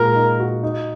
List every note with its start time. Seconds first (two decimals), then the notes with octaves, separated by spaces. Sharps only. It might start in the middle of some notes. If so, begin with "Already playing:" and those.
Already playing: A#2 G#3 F#4 A#4
0.15 D#4
0.39 F#4
0.63 D#4